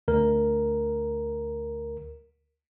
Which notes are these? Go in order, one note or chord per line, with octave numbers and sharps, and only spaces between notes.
D2 A#4